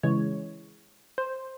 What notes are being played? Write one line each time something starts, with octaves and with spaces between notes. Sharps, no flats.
C#3 E3 G#3 C#5
C5